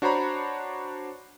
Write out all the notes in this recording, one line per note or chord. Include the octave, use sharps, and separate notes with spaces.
D4 F#4 C5 C#5 A#5 B5